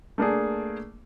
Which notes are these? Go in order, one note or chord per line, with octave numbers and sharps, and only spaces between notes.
A3 A#3 D4 G#4